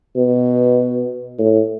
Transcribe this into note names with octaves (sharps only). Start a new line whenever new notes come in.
B2
A2